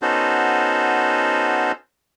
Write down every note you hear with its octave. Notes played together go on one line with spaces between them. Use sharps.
B3 C#4 D#4 F#4 A4 C5